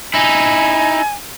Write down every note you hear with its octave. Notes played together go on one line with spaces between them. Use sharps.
D#4 E4 G#5